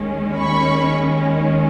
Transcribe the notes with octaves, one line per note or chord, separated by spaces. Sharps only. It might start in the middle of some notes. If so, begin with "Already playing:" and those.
Already playing: D#2 D#3 G#3 C#4
B5 C#6